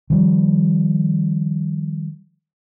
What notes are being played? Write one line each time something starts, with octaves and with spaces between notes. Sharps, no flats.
D#3 F3 G3